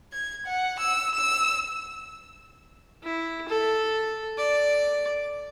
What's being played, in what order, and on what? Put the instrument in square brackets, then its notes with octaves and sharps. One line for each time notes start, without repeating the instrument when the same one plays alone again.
[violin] G#6
F#5
E6
E6
[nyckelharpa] E4
A4
D5